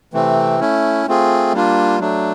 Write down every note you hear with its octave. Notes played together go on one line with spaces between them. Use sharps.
C3 E3 A3 C4
A3 C#4 E4
A3 C4 F4 G#4
G3 A#3 D4 F4
F#3 A3 D4